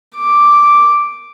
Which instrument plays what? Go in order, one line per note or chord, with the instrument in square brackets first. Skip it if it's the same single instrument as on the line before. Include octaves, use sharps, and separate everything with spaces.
[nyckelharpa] D6